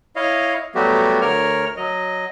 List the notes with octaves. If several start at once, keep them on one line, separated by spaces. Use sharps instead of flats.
E4 C#5 D#5 F5
F#3 G3 A3 B3 F#4 G4
D2 A#4 C#5 F6
F#3 D#5